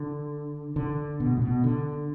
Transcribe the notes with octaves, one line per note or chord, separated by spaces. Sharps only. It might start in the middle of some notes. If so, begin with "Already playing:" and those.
Already playing: D3
D3
B2
A2
B2
D3